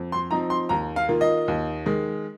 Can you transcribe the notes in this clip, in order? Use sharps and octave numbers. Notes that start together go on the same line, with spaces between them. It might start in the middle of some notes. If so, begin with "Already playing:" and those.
Already playing: F2
C6
F3 C4 D#4 A#5
C6
D#2 A#5
F5
D#3 A#3 F4
D#5
D#2
D#3 G#3